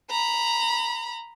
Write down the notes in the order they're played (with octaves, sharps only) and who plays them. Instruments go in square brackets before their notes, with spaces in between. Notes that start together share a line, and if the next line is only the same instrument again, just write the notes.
[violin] A#5 B5